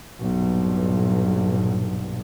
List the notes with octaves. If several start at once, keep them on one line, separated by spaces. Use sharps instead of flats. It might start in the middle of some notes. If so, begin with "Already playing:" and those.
B1 G2 A#2